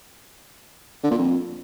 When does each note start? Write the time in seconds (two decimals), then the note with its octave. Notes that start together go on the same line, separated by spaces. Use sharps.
1.04 D3
1.11 A#2
1.19 F2